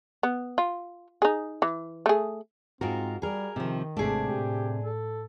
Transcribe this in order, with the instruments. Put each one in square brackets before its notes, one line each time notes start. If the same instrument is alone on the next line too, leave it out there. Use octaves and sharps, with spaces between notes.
[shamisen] B3
F4
D#4 G#4
E3
A3 G#4
[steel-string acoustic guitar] G#2 F4 A#4 [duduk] C4 [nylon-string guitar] F#4
[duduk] G3 [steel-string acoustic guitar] G#4 A#4
[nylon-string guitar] C3 F3 [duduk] D#3
[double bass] G#1 [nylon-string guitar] C3 A3 [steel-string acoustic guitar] D4 G#4
[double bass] A2 [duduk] G4
[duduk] A4